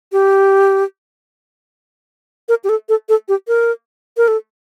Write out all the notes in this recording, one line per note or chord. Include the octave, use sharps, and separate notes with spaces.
G4
A#4
G4
A4
A4
A4
G4
A#4
A#4
A4